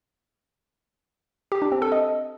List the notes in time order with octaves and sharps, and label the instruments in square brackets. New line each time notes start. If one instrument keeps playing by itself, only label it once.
[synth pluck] G4
D4
C4
A4
D#5